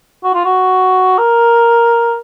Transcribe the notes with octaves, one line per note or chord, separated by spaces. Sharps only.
F#4
F4
F#4
A#4